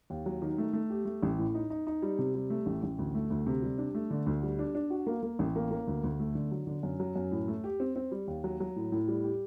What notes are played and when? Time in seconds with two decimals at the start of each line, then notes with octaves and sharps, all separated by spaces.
0.10 D#2
0.26 F#3
0.42 D#3
0.58 A3
0.73 A3
0.90 G4
1.05 A3
1.23 A1
1.38 A2
1.55 D#4
1.70 D#4
1.87 D#4
2.02 G3
2.19 C3
2.34 G3
2.50 A3
2.66 A1
2.83 A1
2.99 D2
3.15 A3
3.30 D2
3.47 C3
3.62 G3
3.78 D4
3.95 A3
4.10 D3
4.26 D2
4.43 G3
4.59 D4
4.75 D4
4.90 F#4
5.07 A#3
5.23 A#3
5.39 A1
5.56 A#3
5.71 A#3
5.87 D2
6.03 D2
6.20 A3
6.35 D3
6.51 F#3
6.67 D3
6.83 F#2
7.00 F#3
7.16 F#2
7.31 A2
7.48 A3
7.64 G4
7.80 C4
7.96 C4
8.12 G3
8.27 D#2
8.44 F#3
8.60 F#3
8.76 A2
8.92 A2
9.08 G3
9.24 G4